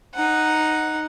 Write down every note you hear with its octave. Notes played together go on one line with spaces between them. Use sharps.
D#4 F#5